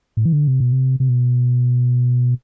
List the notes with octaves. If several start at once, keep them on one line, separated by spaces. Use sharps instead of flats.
A2
E3
D3
C3
B2
C3
C3
B2